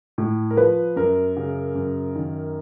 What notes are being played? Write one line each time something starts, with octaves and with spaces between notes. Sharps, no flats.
A2
A#4
F3 B4
F#2 A#4
C#3
F#2
D#3